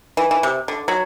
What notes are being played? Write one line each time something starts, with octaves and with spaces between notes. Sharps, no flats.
E3
E3
C3
D3
F#3